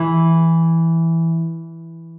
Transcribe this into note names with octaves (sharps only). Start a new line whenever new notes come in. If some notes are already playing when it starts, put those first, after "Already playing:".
Already playing: E3